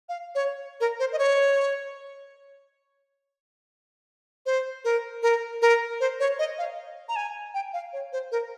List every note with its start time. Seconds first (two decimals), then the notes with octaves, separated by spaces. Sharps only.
0.09 F5
0.35 C#5
0.80 A#4
0.99 C5
1.13 D#5
1.19 C#5
4.46 C5
4.84 A#4
5.23 A#4
5.62 A#4
6.00 C5
6.20 C#5
6.39 D#5
6.58 F5
7.09 A#5
7.16 G#5
7.54 G5
7.73 F5
7.93 C#5
8.13 C5
8.32 A#4